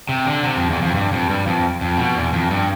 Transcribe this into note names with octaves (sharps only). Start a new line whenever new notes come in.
C3
D3
C3
F2
E2
F2
G2
F2
G2
F2
F2
B2
E2
F2
G2